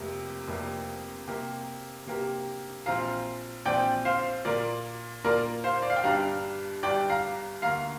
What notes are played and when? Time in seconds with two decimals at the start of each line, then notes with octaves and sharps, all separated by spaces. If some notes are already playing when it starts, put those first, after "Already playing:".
Already playing: F1 F2 C3 A#3 G4
0.48 F1 F2 C3 A#3 G4
1.27 C3 A#3 G4 A#4
2.06 C3 A#3 G4 A#4
2.86 A#1 A#2 F3 C4 F5 A#5
3.65 A#1 A#2 F3 C4 D5 G5
4.05 C5 F5
4.45 A#2 A#3 F4 A#4 D5
5.24 A#2 A#3 F4 A#4 D5
5.64 C5 F5
5.82 D5
5.90 F5
5.96 G5
6.04 G1 G2 G3 D4 F5 A#5
6.83 G1 G2 G3 D4 D5 G5
7.09 F5 A#5
7.62 D2 D3 A#3 F5 A#5